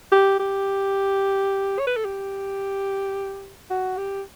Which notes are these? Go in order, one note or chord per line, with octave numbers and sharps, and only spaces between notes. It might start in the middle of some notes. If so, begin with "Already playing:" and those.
G4
G4
C#5
B4
A4
G4
F#4
G4